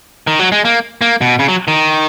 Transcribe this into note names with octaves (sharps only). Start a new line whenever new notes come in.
D#3
F#3
G#3
A#3
A#3
B2
C#3
F#3
D#3